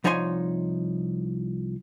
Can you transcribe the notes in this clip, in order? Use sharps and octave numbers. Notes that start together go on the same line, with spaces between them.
C2 F3 D#4 C#5 G#5 C6